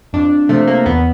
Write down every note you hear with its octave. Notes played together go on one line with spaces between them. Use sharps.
F2 D4
C3 F3 A3
A#3
E2 B3